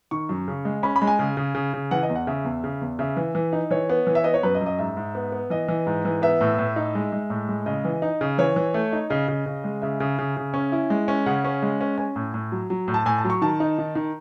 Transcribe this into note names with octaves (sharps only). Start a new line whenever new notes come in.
D#3 C#6
F#2
C#3
G#3
C#4 B5
B5
G#3
G#5
C#3
C#3
C#3
C#3
E3 F#5
D#5
E2
F#5
C#3 E5
E2
C#3
E2
C#3 E5
E3
E3
D#4
E3 C#5
B3
E3
E5
B3 D#5
C#5
F#2 B4
D#5
F#2
D#5
G#2 E5
G#2
B3
B3
E3 D#5
E3
G#2
E3
B3 E5
A2
A2
D#4
G#3
G#3
A2
G#3
C#3 D#5
E3
D#4
C#3
E3 C#5
E3
A3
D#4
C#3 D#5
C#3
C#3
G#3
C#3 E5
C#3
C#3
C#3
C#4
E4
G#3
C#4
C#3 F#5
C#4
G#3
C#4
C#4 G#5
A2
A2
F#3
F#3
A2
A5
A2 G#5
A5
F#3
C#6
D#3 A5
D#4
D#3
D#3